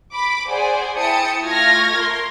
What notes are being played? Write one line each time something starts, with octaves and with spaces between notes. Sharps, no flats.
B5 D6
G#4 C5 D5 F#5 G#5
E4 G5 A5 D#6 C#7
A3 F4 C#6 F6 G#6 A#6
A#4 C6